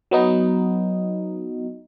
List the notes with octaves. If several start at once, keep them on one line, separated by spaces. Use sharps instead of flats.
F#3 B3 D#4